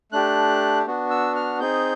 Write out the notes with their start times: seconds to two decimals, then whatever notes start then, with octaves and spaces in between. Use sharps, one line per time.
0.12 A3 D4 G4 F#6
0.87 B3 D4 F#4
1.10 E6
1.36 F6
1.60 C4 D#4 G#4 G6